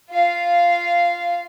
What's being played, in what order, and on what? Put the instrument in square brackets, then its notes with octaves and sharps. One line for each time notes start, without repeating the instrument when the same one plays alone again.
[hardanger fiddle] F4 F5